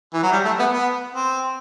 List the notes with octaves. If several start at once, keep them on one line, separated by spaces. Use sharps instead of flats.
E3
F#3
G3
A3
B3
B3
C4